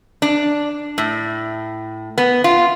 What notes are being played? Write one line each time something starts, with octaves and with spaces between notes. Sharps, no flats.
D4
A2
B3
F4